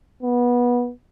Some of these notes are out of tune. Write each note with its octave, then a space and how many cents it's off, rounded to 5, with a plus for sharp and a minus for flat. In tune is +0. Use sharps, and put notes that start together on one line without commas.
B3 -20